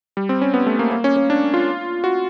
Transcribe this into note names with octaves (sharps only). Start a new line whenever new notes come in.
G3
C4
C#4
B3
A3
A#3
A#3
C#4
C#4
D4
F4
F#4